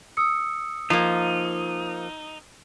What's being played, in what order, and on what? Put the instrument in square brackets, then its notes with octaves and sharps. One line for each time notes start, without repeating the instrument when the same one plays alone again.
[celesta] D#6 E6 C#7
[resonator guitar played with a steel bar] F3 A#3 [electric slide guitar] D#4